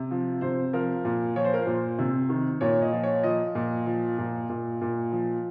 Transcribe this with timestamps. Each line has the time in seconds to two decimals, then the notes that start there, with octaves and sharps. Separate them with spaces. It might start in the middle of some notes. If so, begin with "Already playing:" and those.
Already playing: C3
0.11 F3
0.41 C3 C5
0.73 F3 A#4
1.05 A#2
1.36 F3 C#5
1.44 C5
1.54 A#4
1.62 A#2 C5
1.99 C3
2.29 D#3
2.61 A#2 C#5
2.82 D#5
2.92 F3
3.03 C#5
3.23 F3 D#5
3.55 A#2
3.86 F3
4.18 A#2
4.49 A#2
4.81 A#2
5.12 F3